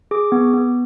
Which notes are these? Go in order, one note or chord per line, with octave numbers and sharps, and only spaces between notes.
G#4 D6
B3
B3